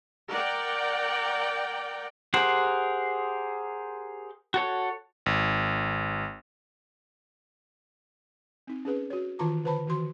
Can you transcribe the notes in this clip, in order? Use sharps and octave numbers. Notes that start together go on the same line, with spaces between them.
A#4 D5 F#5 G5
G4 G#4 A#4 C5 F#5
F#4 A4 C#5
G#1
C4 D#4
C#4 G#4 B4
F#4 C#5
D#3 E3 F4 A5 A#5 D6
D3 B4 C5 A5 B5
D#3 E3 F#4 C6